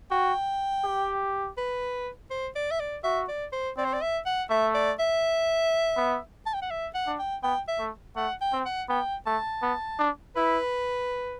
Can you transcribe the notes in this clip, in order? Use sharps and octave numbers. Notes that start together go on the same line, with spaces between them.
F#4 G5
G4
B4
C5
D5
E5
D5
F#4 E5
D5
C5
C4 D5
C5
D5
E5
F#5
A3 E5
D5
E5
B3
A5
G5
F#5
E5
F#5
D4
G5
B3 G5
E5
A3
A3 F#5
G5
C4
F#5
B3 G5
A3 A5
B3
D4
E4 B4